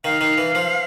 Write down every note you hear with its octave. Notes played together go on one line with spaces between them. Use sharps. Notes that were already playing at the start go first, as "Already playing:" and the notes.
D#3 F5
D#3
E3
F3